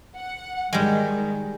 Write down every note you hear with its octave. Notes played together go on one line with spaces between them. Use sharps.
F#5
G#2 D#3 G3 G#3